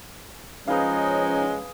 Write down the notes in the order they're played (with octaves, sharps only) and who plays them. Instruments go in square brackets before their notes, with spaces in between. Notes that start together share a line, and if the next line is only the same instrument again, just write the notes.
[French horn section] F3 C#4 [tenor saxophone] G#3 [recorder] D#4 [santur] G#4 B4 F5